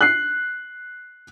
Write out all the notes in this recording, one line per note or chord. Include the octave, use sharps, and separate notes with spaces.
F#6 C7